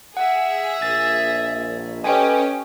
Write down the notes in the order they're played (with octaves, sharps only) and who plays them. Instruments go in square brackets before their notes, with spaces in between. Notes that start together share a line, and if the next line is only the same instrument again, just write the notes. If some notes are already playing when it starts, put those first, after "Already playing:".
[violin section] G#4 E5 [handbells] F#5
[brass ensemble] A#1 [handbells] A6
[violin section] C#4 G4 [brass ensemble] A4 B4 D#5 [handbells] G5 G#5